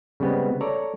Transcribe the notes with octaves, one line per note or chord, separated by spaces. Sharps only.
C#3 G3 G#3 B3 C4
A4 C#5 D5 A#5